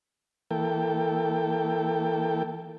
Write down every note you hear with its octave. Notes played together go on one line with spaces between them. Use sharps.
E3 A#3 A4 G5